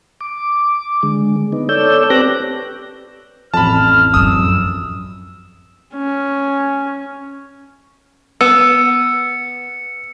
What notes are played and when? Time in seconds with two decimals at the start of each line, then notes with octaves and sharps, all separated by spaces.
0.21 D6
1.03 D3 G#3
1.52 B3 D#4
1.69 A4 C#5 D5 E6 G6
2.10 C4 G4 B4 D6 F#6 A#6
3.54 A1 F2 A5 B5 F6
4.14 C#2 F#2 D#6 E6
5.95 C#4
8.41 B3 E6 C#7